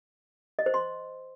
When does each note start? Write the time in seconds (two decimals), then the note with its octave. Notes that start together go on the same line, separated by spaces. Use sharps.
0.59 D#5
0.66 C5
0.74 C6